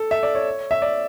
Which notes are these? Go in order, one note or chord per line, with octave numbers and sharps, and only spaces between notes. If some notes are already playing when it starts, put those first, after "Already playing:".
Already playing: A4
E5
D5
C#5
E5
D5